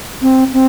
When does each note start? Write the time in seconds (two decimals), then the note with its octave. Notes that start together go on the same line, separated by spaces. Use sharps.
0.22 C4
0.53 C4